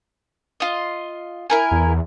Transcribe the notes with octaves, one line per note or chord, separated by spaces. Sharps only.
F4 D#5
E4 A#4 G#5
E2